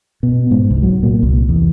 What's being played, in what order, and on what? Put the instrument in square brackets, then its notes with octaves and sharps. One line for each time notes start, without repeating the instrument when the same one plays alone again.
[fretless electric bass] B2
G#2
C2
F#3
A#2
C2
E2